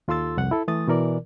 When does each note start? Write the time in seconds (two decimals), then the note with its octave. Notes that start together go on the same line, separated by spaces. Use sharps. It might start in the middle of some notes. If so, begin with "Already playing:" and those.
0.08 D#2 F4 A4 C6 E6 A6
0.37 C2 F2 F#5
0.51 E4 A4
0.68 E3 A3 D#6 A6
0.88 B2 E3 A#4 D5